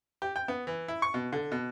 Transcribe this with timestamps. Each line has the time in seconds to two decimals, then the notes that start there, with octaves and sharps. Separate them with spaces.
0.22 G4
0.36 G5
0.48 B3
0.67 E3
0.88 E4
1.02 C#6
1.14 B2
1.33 D3
1.52 B2